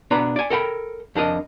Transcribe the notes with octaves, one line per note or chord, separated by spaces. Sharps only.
B2 D4 B4 A#5 B5
D5 G#5
A4 A#4 G5 B5
F2 D4 A#4 D#5